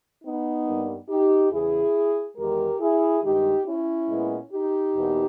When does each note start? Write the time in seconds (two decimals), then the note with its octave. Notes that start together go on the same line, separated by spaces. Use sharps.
0.23 B3 D#4
0.66 G2 G3 A#3
1.08 D#4 G4
1.51 E2 C#3 E3 E4 G#4
2.36 E2 D#3 G#3 G4 A#4
2.80 E4 G#4
3.22 G2 D#3 G#3 D#4 G4
3.66 C#4 E4
4.08 A#2 G#3 B3
4.51 D#4 G4
4.93 E2 B2 A#3